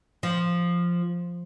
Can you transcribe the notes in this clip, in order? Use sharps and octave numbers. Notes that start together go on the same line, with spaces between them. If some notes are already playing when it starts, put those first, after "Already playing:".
F3